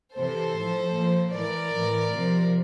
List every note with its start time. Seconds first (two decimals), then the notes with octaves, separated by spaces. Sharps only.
0.16 C3 E3 A4 C5
0.55 A2 F3
0.95 A#2 F3
1.34 A2 E3 A#4 D5
1.73 A2 E3
2.13 C3 F3